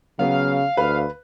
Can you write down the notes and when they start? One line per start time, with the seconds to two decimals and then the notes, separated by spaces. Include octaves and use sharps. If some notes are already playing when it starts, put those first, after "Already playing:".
0.19 C#3 F#3 B3 F5
0.77 D2 B4